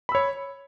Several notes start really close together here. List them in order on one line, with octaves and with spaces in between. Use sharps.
B5 E6 C#5